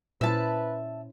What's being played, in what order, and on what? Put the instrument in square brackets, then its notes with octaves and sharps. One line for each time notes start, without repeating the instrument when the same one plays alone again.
[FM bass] A#2 [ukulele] C#4 E4 C5 [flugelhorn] B4 [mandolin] E5 A5